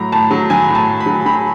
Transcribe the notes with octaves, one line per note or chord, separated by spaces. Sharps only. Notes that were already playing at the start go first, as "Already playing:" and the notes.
Already playing: A2 F#3 A#5
A2 A5
F#3
F#3 G#5
A2
A5
A2
B5
F#3
F#3 B5